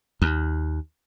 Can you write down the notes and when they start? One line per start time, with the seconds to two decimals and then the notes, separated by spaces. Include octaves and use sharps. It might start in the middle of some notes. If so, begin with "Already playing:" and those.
0.22 D#2